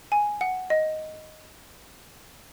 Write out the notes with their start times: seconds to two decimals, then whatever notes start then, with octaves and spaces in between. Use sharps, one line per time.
0.12 G#5
0.41 F#5
0.70 D#5